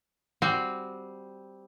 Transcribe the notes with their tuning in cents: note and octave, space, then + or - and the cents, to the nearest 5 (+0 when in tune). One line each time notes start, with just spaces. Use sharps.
G3 +0 C4 +0 F#4 +0